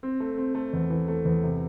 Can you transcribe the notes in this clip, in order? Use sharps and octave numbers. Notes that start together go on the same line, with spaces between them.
C4
A3
C4
A3
E2
E3
A3
E2
C3